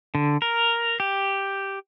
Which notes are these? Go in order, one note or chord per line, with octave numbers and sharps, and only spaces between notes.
D3
A#4
G4